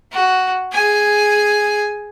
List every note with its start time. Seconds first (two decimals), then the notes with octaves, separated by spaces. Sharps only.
0.12 F#4
0.72 G#4 G#5